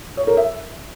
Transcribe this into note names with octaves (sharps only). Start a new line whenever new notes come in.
C#5
A#4
E5